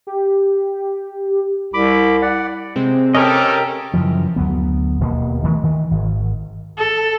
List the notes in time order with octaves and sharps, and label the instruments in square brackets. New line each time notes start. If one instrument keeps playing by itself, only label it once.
[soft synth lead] G4
[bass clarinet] C2 [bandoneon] B5 D6
[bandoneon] D5 F#5
[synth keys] C3 G#3 C4
[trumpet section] C#4 A4 [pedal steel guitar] G4 A#4 D#5
[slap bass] F#2 C#3 E3 F3
D2 F#3 B3
D#1 B2 A#3
D#3 E3 G#3 A3
D#3 E3
G#1
[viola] A4